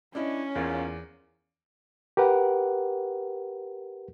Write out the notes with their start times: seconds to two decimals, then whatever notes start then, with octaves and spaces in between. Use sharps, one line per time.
0.15 C#4 D4 E4 D#5
0.55 E2 G#2 A#3 F4
2.17 G4 A#4 B4 F#5